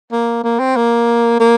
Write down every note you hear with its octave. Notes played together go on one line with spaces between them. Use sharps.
A#3
A#3
C4
A#3
A#3